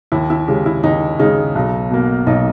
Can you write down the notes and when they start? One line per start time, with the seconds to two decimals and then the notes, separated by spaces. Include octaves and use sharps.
0.12 D#2 E4
0.30 E4
0.48 C#3 G#3 G4
0.66 E4
0.83 D#2 D#4
1.19 C#3 G#3 D#4
1.55 B1
1.91 B2 A#3
2.27 B1 D#4